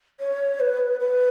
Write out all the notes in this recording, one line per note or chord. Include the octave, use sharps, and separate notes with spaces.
C#5
B4
B4